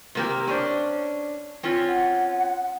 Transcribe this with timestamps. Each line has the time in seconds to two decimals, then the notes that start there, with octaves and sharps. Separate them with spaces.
0.15 C3 A#3 G4
0.48 C#4 D4 C5
1.63 C4 C#4 F4
1.88 F#5